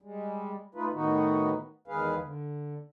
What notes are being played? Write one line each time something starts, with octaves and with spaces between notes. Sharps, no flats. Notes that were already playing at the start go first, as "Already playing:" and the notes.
G3 G#3
A3 D#4 F4 B4
A2 D#3 B3 D#4 F#4
E2 D#3 G#3 G#4 B4 F5
D3